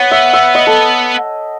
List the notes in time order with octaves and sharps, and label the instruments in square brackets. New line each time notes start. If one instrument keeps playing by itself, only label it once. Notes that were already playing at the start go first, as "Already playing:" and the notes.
Already playing: [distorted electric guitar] B3 [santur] C#5 F#5
[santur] E5
E5
D#5
A4